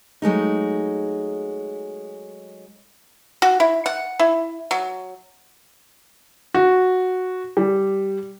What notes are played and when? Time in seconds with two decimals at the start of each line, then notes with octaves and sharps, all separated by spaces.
0.22 F#3 G#3 A3 D#4
3.42 F#4
3.60 E4
3.86 F#5
4.19 E4
4.71 F#3
6.54 F#4
7.57 G3